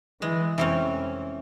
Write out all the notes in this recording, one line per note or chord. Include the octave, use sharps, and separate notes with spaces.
E3 G#3
F1 E3 C4 C#4